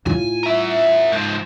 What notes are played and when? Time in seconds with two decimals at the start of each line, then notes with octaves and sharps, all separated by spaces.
0.06 A2 F4 G#5
0.43 A#4 E5
1.12 G#2 F3